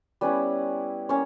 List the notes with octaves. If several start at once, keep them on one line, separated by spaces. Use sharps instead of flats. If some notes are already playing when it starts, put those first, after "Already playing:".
G3 B3 C#4 E4 B4
A#3 C#4 C#5